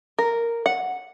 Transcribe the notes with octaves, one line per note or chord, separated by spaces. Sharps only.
A#4
F#5